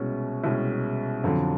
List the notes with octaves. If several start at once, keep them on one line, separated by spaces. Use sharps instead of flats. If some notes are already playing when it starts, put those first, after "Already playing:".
Already playing: C2 B2 G#3 C#4
C2 B2 G#3 C#4
F2 D3 F#3